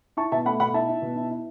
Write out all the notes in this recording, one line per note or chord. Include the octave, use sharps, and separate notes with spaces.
E4 A5 C#6
B2 E5 A5
A3 F#5 B5
B2 F#5 B5
E4 E5 A5
E4
B2
E4
E4